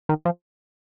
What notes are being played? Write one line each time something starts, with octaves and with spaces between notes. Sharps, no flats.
D#3
F3